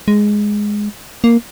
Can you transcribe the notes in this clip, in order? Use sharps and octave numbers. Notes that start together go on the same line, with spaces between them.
G#3
A#3